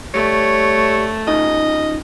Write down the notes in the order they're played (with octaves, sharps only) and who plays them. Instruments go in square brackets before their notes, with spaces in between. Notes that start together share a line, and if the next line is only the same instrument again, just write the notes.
[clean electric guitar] G3 [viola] A3 [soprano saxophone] C#5
[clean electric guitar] C#4 D#4 F4 [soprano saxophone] D#5